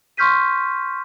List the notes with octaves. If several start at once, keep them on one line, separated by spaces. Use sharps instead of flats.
C6 C#6 F6 G6 B6 D#7